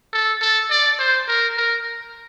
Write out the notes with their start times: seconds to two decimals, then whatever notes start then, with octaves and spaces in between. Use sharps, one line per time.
0.13 A4
0.42 A4
0.70 D5
0.99 C5
1.28 A#4
1.57 A#4